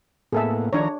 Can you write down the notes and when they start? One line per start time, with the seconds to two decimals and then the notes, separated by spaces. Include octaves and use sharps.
0.33 A2 A#3 B3 G#4 A4 E5
0.73 D#3 F3 D4 C#5 A#5